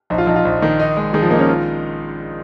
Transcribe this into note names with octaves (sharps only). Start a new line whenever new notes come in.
A#1 D#4
F4
A#1 D#4
F4
A#1
D#3
D#4
G#3
D#3 G#4
F3
A#3 D#4
C#4
F4